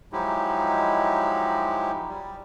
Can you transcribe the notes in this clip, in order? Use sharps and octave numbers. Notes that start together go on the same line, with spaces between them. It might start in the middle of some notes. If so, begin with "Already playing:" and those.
F3 F#3 G#3 D#4 E4 G4
G3